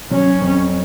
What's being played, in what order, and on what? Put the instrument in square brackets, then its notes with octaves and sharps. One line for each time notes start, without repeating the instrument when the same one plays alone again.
[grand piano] F#3 [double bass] C#4
[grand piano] F2